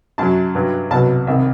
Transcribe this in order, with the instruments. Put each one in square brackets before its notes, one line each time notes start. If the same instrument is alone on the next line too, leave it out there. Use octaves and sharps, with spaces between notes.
[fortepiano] F#2 F#3 A5
G2 F#3
C2 B2 F#3 A5
C2 C3 D#3 E5